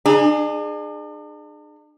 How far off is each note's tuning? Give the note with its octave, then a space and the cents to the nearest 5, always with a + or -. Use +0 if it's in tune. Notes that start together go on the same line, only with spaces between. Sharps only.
D4 +45 G#4 +0